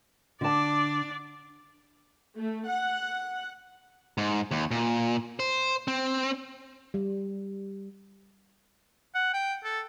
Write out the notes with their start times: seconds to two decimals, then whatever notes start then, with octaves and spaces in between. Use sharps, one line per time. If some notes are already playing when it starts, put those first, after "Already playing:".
0.41 D3 D4 D5 A5
2.38 A3
2.70 F#5
4.18 G#2
4.51 D#2
4.71 A#2
5.40 C5
5.88 C4
6.94 G3
9.15 F#5
9.34 G5
9.64 A4